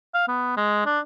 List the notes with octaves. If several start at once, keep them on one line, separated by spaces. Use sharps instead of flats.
F5
B3
G#3
D4